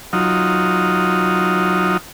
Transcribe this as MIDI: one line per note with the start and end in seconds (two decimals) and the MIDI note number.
0.13 1.97 54
0.13 1.97 63
0.13 1.97 65